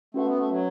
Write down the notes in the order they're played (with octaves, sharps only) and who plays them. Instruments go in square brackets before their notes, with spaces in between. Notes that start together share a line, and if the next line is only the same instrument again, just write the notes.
[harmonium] A3 [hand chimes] C#4 F#4 B4 F#5
[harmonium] B3
A3
F#3